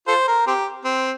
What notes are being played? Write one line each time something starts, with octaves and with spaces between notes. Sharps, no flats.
F4 A4 C5
A#4
C4 G4
C4